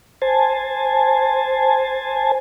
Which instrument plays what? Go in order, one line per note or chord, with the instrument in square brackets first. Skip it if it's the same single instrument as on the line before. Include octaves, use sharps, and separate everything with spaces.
[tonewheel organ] C5 G#5 A5